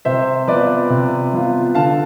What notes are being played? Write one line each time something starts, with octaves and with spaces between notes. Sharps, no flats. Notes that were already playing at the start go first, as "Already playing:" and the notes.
C3 C5 E5
F3 B3 F4 B4 D5
C3
F3 B3 F4
D3 F5 A5